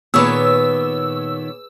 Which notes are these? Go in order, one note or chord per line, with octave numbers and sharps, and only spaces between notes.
A#2 D#3 B3 G#4 B4 C#5 D6 E6